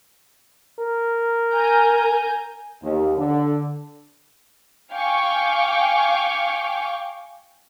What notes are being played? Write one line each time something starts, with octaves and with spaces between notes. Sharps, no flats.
A#4
G#5 A#5 G6
D#2
D3
F5 G5 G#5 C#6 D6